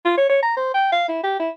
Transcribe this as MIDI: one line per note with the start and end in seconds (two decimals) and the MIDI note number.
0.05 0.17 65
0.18 0.28 73
0.30 0.42 73
0.42 0.54 82
0.57 0.71 72
0.74 0.90 79
0.92 1.08 77
1.08 1.20 64
1.24 1.36 67
1.40 1.50 64